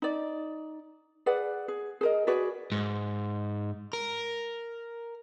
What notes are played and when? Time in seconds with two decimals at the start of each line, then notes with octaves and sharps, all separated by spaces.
0.02 D#4 D5
1.26 G#4 B4 D5 F#5
1.68 G#4
2.01 G#4 A#4 D#5
2.27 F#4 G#4 B4 D5
2.72 G#2
3.93 A#4